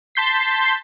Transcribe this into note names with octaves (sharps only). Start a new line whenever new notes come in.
A5 C6 G6 B6 C7